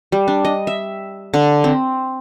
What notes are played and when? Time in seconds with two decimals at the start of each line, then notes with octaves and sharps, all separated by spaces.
0.12 G3
0.28 D4
0.45 D#5
0.67 E5
1.34 D3
1.64 C4